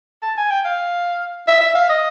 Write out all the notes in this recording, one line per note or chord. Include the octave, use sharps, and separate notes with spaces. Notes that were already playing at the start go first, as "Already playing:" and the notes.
A5
G#5
G5
F5
E5
E5
F5
D#5